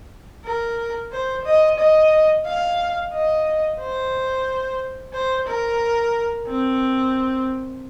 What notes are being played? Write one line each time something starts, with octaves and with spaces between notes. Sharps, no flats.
A#4
C5
D#5
D#5
F5
D#5
C5
C5
A#4
C4